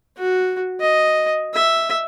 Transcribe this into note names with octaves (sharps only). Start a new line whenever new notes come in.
F#4
D#5
E5